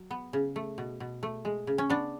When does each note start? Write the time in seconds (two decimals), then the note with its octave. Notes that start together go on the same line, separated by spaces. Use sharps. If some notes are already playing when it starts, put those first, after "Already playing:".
Already playing: F#3
0.11 B3
0.33 C#3
0.56 A3
0.78 B2
1.00 B2
1.23 A3
1.45 G#3
1.67 C#3
1.78 C#4
1.90 B3 D4